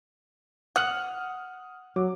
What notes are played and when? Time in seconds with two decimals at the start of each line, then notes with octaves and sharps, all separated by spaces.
0.76 F#5 D#6 F6 F#7
1.96 F#3 D6